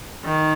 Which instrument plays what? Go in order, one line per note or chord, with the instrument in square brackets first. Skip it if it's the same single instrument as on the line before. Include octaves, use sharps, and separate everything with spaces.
[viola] D#3